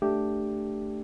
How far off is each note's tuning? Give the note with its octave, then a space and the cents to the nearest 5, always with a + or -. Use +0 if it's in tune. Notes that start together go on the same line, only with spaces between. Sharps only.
A3 +0 D4 +0 G4 +0